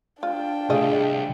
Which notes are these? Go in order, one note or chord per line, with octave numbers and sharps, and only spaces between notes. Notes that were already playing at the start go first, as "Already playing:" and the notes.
D4 F4 G5
C2 A3 F4 G#4 D#5